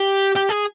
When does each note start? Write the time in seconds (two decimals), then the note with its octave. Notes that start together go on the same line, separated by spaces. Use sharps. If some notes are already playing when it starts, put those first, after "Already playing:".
Already playing: G4
0.36 G4
0.50 G#4